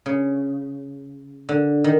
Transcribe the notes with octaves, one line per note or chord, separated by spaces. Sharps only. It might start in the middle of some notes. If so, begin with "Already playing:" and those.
C#3
D3
D#3